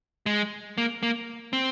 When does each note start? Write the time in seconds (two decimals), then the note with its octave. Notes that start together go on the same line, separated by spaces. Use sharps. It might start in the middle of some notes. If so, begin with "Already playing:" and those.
0.26 G#3
0.78 A#3
1.03 A#3
1.53 C4